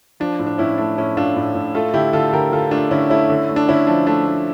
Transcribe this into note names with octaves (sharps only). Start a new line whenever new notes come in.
F3 D4
A2
D4
A2 C#4 E4
A3 D4
A2 C#4 E4
A2 D4 F4
A2
A2
A3 F4 A4
D3 E4 G4
D3 F4 A4
D3 G4 A#4
D3 F4 A4
A3 D4 F4
D3 C#4 E4
A3 C#4 E4
D3
A3
D4
D3 C#4 E4
F3 D4
A3 D4
A3